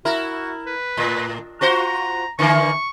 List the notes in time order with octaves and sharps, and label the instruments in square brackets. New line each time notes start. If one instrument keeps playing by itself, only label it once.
[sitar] E4 A#4 [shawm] F#4
[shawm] B4
[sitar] A2
[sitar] F4 F#4 C5 [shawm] A#5
[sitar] D3 E3 A#3 [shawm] C#6